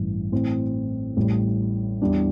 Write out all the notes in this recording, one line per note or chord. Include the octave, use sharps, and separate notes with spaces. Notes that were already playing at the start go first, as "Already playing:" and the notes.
Already playing: A1 G2 E3
A2 E3 C4
A1 A2 G3
E2 E3 G3 D4